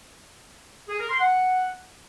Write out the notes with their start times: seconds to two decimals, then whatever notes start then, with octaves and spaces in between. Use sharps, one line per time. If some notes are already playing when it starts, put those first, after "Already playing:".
0.88 G#4
0.99 A#4
1.09 C6
1.20 F#5